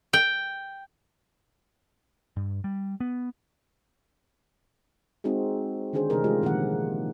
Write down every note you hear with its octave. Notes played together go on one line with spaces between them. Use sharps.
G5
G2
G3
B3
G#3 C4 D#4 F#4 G#4
D3 D#3 C#4 D4 G#4 C5
C3 E3 A3 D#4 G#4 A#4
G#3 F4 G4
A#2 D#3 F3 A#3 F#5